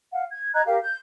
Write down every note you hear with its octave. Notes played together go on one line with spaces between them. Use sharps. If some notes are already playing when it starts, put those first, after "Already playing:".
F5 F#5
G#6
D#5 A#5 F#6 G#6
G4 A#4 F5
G6